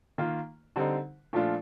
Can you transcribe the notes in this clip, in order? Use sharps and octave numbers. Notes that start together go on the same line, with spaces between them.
D#3 A#3 F4
D3 G3 C4 D#4
A#2 F3 A3 D4 F4